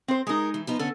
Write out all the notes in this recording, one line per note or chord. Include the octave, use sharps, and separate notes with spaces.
C4 C5
G#3 D#4 G#4 A#4
E3
F3 B3 D#4
D3 C#4 D4 A4